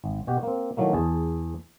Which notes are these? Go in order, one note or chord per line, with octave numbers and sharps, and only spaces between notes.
G#1
B2 F#4 G4
A#3 C4
D#3 E3 F#3 A3 A#3
E2 G#4 A5